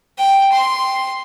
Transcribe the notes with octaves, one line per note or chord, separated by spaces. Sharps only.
G5
C6